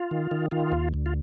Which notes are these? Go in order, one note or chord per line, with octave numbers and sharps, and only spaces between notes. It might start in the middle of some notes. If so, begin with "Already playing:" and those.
Already playing: F4
D#3
D#3
D#3 F4
D#2
D2
F4